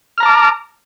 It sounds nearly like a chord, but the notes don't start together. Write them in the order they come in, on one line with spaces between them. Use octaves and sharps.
F6 A#5 A5 D6